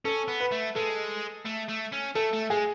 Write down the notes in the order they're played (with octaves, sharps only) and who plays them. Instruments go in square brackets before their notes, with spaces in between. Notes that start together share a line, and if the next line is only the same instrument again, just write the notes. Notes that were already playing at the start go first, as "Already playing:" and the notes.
[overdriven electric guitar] C#4 [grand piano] A4
[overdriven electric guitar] B3
[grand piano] B4
[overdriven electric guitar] A3
[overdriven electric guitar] G#3 [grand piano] A4
[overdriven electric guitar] A3
A3
C#4
[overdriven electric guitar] A3 [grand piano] A4
[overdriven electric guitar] A3
[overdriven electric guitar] G#3 [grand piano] G#4